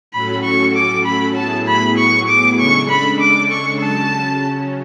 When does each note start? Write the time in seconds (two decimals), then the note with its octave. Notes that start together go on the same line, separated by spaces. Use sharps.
0.13 A2 F#3 C#4 F#4 A4 B5
0.43 C#6
0.75 D6
1.05 B5
1.36 A2 F#3 B3 E4 G#4 A5
1.67 B5
1.98 C#6
2.28 D6
2.58 C#3 G#3 D4 A4 C#6
2.89 B5
3.20 D6
3.51 C#6
3.80 C#3 F#3 C#4 A5